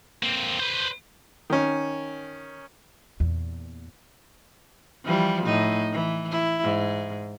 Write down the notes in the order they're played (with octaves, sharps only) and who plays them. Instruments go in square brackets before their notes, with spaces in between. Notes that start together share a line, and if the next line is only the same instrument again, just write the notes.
[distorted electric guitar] A#3 C4
B4 C5
[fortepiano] D#3 C#4
[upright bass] E2 A#2
[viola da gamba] E3 F3 G3
A2 D#4
E3
E4
G#2